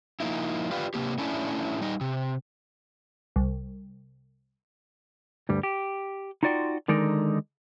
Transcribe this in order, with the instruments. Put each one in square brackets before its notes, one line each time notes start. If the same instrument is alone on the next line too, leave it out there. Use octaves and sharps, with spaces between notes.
[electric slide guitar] F3 A#3 D#4 E4
F4 G4 B4 D5 F5
C3 E3 A#3 G4
A3 C#4 D4 E4
G3 D#4
C3
[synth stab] C2
[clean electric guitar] D2 G2 G3
G4
D#4 F4 F#4 D5 G5 C6
D3 D#3 G#3 D#4 A#4 D5